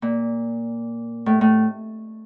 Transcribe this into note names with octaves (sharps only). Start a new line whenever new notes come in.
A#2
A2
A2